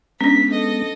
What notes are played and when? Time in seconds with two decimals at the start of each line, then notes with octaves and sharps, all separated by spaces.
0.21 G#3 B3 C#4 D4 B6
0.51 A4 D#5